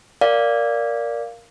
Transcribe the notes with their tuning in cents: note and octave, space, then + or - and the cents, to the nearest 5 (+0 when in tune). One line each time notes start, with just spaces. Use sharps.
A#4 +0 D5 -10 F5 +0